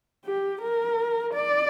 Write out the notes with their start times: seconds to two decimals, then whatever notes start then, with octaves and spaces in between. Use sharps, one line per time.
0.25 G4
0.61 A#4
1.34 D5